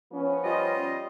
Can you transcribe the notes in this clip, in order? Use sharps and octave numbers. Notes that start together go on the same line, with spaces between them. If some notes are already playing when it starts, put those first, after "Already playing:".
F3 B3 C#4
G3 F4 D#5